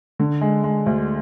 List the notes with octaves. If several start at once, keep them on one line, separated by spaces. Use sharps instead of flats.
D3
G#3
G#3
D2